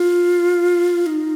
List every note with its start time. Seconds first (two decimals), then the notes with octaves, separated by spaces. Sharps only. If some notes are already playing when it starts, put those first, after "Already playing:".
Already playing: F4
1.06 D#4